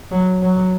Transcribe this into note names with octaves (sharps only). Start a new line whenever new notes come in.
F#3
F#3